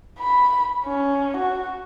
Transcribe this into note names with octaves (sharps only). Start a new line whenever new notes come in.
B5
C#4
F#4